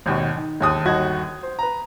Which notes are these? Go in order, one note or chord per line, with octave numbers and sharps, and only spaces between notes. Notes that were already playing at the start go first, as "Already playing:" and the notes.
G#1 D#2 B2
D#3
E1 D#2 D#6 F#6
G1 D#2 D#3 F#4 D#5 G#6
C5
B4 A#5